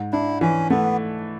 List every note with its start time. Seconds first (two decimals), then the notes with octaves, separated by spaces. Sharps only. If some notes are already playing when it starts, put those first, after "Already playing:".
Already playing: G#2
0.12 D4 E4
0.41 E3 C#4
0.70 A3 B3